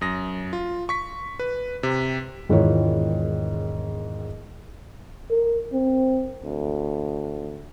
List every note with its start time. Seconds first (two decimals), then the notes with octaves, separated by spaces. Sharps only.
0.01 F#2 D#6 A#6
0.53 F4
0.89 C#6 B6
1.39 B4
1.83 C3
2.49 E1 G#2 D#3 E4 F4 C#5
5.30 A#4
5.73 C4
6.44 D2